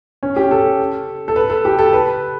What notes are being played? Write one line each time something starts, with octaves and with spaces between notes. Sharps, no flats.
C#4
G4
A4
A4
B4
A4
G4
A4
B4